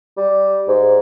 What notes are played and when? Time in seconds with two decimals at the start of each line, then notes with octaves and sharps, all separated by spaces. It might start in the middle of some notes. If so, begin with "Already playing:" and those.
0.17 G3
0.68 G#2